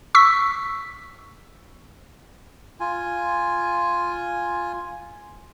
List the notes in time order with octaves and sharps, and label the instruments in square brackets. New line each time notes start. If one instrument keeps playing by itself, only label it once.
[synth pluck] C#6 E6 B6
[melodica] F4 G#5